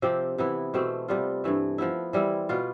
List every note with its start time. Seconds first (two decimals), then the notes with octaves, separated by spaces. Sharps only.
0.02 C3 F3 C4 G4
0.38 C3 E3 B3 E4
0.74 B2 A3 C4 G4
1.08 C3 G3 B3 F4
1.44 G2 E3 A3
1.78 F3 B3 E4
2.13 E3 G3 C4 E4
2.49 B2 B3 F4